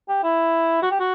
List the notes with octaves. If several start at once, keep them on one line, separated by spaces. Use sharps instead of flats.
G4
E4
F#4
G4
F#4